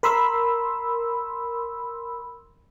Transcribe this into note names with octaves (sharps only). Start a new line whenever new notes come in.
A#4 B5 C6 E6